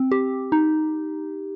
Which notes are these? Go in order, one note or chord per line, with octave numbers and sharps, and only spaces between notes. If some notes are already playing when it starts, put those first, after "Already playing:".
Already playing: C4
G4
D#4